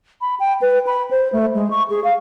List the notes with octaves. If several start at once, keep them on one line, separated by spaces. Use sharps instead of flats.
B5
G5
B4
B5
C5
A3
G#3
C#6
G#4
F5